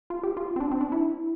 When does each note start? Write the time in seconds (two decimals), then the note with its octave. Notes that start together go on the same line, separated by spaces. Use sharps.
0.10 F4
0.23 G4
0.37 F4
0.56 C4
0.60 D4
0.71 C4
0.81 D4
0.92 E4